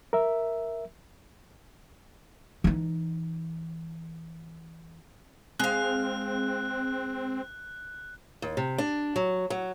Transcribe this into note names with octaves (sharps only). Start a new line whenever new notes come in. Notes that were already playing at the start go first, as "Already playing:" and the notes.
A#4 E5
E3 D#4
G#3 C4 F5 F#6
D#2
C3
D4
F#3
F#3